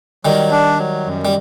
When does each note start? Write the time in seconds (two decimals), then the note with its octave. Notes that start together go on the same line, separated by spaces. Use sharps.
0.25 D#3 F#3 G3
0.51 D4
0.79 F#3
1.06 F#2
1.25 G3